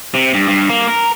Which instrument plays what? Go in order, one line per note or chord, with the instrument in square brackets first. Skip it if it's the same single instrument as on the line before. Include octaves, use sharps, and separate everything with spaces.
[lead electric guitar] C3
G2
G2
A#3
A#4